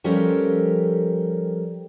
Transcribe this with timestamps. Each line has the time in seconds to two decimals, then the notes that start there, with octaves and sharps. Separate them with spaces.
0.04 F3 G3 C#4 G4 A4 A#4